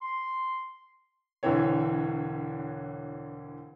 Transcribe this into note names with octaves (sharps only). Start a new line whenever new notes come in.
C6
E1 D3 E3 C4 C#5